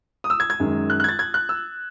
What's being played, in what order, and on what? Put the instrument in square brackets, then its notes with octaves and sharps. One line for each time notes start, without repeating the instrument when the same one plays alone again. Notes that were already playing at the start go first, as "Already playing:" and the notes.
[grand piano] D#6
E6
G#6
G#6
F#2 D#3 G#3
F#6
F#6
G#6
A6
G#6
F#6
E6